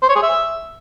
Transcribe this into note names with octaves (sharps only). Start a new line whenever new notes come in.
C5
C#5
G#4
E5